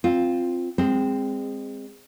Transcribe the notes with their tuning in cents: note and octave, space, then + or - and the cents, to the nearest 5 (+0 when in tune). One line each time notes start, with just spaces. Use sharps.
C4 +0 F4 +0
G#3 -25 C4 +0